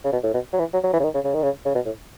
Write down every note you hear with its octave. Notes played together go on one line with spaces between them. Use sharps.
C#3
B2
A2
B2
F#3
E3
F#3
F#3
E3
C#3
D#3
C#3
C#3
D#3
C#3
C#3
B2
A2